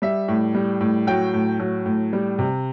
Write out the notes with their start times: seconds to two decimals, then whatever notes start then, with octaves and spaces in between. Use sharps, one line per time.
0.02 G3 E5
0.28 A2
0.54 G3
0.80 A2
1.07 F#3 G5
1.33 A2
1.60 F#3
1.86 A2
2.13 G3
2.39 C3